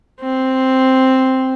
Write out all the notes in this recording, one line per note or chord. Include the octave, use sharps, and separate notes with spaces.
C4